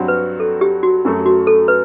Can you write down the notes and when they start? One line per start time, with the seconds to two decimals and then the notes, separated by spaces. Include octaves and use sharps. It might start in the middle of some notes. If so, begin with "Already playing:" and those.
Already playing: G2 F#3 C4 F#4
0.08 B4
0.40 A4
0.61 G4
0.83 F#4
1.05 F#2 F#3 A3
1.26 F#4
1.47 A4
1.68 B4